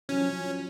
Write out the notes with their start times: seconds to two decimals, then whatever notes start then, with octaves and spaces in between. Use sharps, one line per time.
0.09 E3 F#3 C#4
0.19 F3